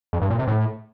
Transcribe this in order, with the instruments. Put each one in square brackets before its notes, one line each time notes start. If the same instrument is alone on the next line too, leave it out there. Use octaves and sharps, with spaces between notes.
[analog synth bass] F2
G2
A#2
C3
A2